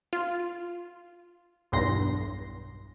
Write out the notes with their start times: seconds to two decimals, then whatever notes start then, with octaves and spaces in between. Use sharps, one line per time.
0.13 F4
1.72 B1 E2 G2 C6 A#6